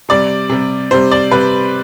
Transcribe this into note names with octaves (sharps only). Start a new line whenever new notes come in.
C3 G3 D5
C3 G3
C3 G3 C5
D5
C3 G3 B4